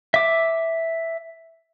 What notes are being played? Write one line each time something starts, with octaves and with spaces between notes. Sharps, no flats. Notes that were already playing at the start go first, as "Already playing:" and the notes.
E5 D6